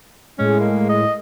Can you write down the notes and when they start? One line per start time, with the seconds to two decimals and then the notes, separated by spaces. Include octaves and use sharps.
0.38 A2 G#3 C#4
0.60 A#3
0.89 D#5